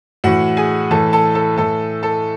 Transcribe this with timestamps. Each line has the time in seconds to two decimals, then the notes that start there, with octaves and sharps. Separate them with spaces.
0.24 A2 E3 F#4 F#5
0.57 G#4 G#5
0.91 A2 E3 A4 A5
1.13 A4 A5
1.35 A4 A5
1.57 A2 E3 A4 A5
2.03 A4 A5